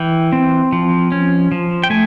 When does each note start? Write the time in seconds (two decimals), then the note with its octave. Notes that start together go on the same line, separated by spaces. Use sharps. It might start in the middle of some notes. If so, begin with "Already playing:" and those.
Already playing: E3 G5
0.33 C4
0.73 F3
1.12 C#4
1.52 F3
1.83 G5
1.90 A3 G#5